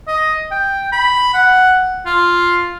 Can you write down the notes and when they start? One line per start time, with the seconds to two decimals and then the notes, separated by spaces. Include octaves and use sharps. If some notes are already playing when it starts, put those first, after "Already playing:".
0.07 D#5
0.51 G5
0.92 B5
1.34 F#5
2.06 F4